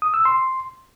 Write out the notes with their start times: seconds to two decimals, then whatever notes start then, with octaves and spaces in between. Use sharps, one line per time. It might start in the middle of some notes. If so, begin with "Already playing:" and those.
0.02 D#6
0.14 E6
0.25 C6